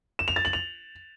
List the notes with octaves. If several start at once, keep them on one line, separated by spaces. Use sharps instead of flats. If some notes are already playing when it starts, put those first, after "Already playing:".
E7
F7
A6
F#7
F7